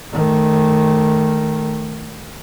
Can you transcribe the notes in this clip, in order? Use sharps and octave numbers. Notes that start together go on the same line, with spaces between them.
D#3 A3